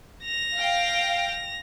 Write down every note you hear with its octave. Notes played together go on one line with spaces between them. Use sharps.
A#6 F7
F5 G5